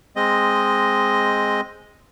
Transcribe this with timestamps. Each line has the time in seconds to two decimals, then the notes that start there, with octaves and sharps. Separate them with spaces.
0.16 G#3 C4 D#5